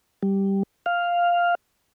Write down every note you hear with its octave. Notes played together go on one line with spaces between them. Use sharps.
G3
F5